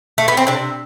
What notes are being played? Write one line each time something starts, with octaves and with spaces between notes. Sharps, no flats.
A3
B3
C4
C3 D4